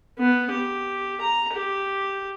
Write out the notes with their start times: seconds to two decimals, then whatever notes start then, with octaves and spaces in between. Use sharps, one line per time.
0.19 B3
0.51 G4
1.21 A#5
1.53 G4